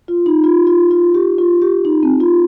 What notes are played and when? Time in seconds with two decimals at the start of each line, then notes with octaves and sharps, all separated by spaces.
0.08 F4
0.26 D#4
0.44 F4
0.67 F4
0.91 F4
1.14 G4
1.38 F4
1.62 G4
1.85 D#4
2.03 C4
2.20 F4